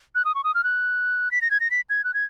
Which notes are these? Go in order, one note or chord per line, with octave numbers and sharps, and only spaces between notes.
F#6
D#6
C#6
D#6
F6
F#6
B6
A#6
G#6
A#6
B6
G#6
F#6
G#6